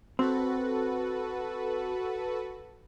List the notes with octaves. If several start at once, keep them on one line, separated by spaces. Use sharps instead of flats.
C4 F#4 A4 B4